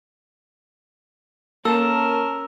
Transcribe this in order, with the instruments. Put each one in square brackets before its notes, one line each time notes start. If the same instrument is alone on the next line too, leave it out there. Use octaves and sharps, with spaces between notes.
[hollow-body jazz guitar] A#3 A4 [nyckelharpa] C#4 A#4 [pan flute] A5 [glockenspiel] E6